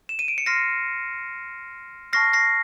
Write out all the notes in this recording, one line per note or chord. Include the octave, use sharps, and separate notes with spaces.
E7
D#7
D7
C#7
C6 F6 A#6 C7
A5 C#6 F6 A#6 C7
A#6 C7